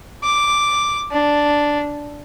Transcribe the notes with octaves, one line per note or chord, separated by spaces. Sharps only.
D6
D4